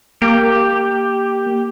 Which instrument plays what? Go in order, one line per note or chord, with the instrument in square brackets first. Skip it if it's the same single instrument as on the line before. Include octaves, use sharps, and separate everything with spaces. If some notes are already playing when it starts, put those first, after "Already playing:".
[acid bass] A#3 [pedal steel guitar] G4